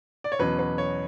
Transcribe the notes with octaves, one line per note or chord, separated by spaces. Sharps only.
D5
C#5
E2 B2 F#3 C#4 B4
B4
C#5